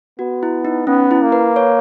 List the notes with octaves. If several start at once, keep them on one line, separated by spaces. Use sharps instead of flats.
B3 F#4
E4
D#4
B3 C#4
E4
A#3
B4
C#5